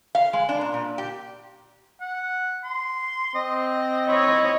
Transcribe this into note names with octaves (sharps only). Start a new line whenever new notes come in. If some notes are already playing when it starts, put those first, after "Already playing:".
F5
G#3
D4
A#2
A#2
G4
F#5
C6
C4 D#5
E4 C#5 D#5